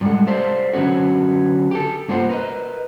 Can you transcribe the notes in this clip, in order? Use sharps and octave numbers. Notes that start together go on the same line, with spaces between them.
A2 G3 G#3 A4 F#5
G4 A4 C5 D5 E5 F5
D3 F#3 B3 C#4 F#4
G4 A4
G2 A#3 F4 C5 F#5
A#4 B4 D#5